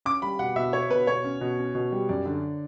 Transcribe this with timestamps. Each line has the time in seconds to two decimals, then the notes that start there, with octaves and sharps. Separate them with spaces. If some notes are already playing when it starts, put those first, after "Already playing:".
0.05 C#4 D6
0.22 G3 B5
0.39 B2 F#5
0.56 B2 E5
0.73 B2 C#5
0.91 B2 B4
1.07 B2 C#5
1.24 C#4
1.41 B2
1.58 C#4
1.75 B2
1.92 G3
2.09 F#2 D5
2.26 D3